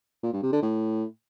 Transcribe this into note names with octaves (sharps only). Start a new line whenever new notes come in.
A#2
G2
C3
D3
A2